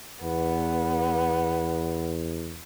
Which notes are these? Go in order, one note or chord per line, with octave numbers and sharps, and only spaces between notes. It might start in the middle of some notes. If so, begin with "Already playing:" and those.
E2 B3